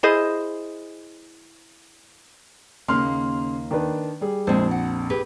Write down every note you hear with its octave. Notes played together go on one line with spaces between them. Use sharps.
E4 G#4 C5 D#5
D#2 C#3 A#3 D#4 C6 F6
D#3 D4 B4
G3 G#4
A#1 F2 G#3 C5
F#5
G4 G#4 B4